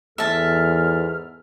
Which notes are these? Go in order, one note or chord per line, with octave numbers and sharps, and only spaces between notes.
E2 G#2 A4 E5 A5 F6